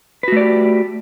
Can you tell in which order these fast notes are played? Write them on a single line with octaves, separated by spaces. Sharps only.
B4 F#4 A3 D5 G4